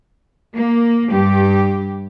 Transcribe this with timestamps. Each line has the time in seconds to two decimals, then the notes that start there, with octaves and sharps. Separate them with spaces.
0.53 A#3
1.09 G2 G4